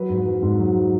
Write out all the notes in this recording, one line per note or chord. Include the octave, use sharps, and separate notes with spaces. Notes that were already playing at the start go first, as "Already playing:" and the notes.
Already playing: F#3 B4
G#2
F#3
G#2
F#3